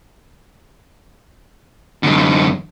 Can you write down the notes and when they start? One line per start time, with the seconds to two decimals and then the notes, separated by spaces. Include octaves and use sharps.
2.03 F#2 D3